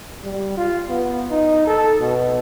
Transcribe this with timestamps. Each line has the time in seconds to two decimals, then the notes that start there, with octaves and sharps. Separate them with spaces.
0.24 G3
0.57 F4
0.89 B3
1.30 D#4
1.67 A4
2.00 B2